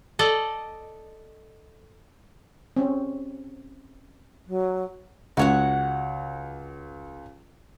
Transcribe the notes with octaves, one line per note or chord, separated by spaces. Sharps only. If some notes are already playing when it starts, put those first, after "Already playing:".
A4 D5 D#5
C4 C#4
F#3
C#2 F#4 C#5 F#5